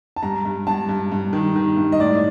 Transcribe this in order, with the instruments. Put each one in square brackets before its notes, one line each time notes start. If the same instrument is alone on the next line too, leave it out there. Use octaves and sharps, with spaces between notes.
[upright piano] A5
G2 A#5
G2
G2 A5
G2
G2
D#3
D#3
G2
D#5
A2 D5